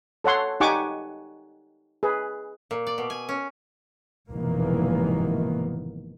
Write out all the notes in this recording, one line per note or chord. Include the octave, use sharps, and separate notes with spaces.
A4 C#5 F#5 C6
D#4 G4 F#5 G#5 C#6 D6
G#4 B4
A#2
D5
B2
G#5
C#4
F1 G#2 B2 D#3 E3 A#3